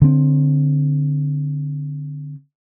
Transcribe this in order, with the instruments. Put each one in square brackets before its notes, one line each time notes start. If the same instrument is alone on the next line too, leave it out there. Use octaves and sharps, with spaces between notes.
[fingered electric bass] D3 C4